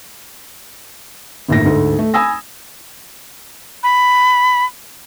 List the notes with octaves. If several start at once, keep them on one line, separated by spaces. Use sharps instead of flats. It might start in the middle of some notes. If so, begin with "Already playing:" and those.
G1 D#2 A2 A#6
D2 G#2 A4
A3
G#5 B5 D#6 E6 A#6
B5